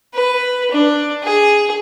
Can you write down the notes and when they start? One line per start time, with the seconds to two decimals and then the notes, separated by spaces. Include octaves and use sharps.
0.14 B4
0.72 D4
1.23 G#4